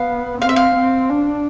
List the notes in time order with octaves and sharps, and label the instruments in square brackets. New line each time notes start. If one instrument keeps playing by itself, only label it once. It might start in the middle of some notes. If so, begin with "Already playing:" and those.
Already playing: [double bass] B3 [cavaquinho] F5
[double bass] C4 [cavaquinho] F5
[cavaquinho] E5
F5
[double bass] C4
D4